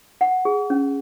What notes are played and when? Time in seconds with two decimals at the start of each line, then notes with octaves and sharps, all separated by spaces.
0.21 F#5
0.45 G#4
0.70 C#4